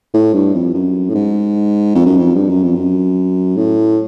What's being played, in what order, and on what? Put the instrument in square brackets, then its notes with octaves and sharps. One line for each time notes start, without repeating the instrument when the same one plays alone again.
[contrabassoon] A2
G2
F2
F#2
A2
G#2
F2
F#2
F2
G2
F#2
F2
F#2
A2